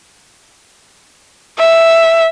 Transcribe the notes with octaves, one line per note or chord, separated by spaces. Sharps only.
E5